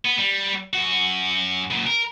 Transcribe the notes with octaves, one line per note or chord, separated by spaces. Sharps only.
B3
G3
F#2 F#4
F#2 A#2
A#4